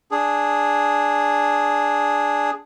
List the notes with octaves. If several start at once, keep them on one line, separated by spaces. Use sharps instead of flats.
D4 G#4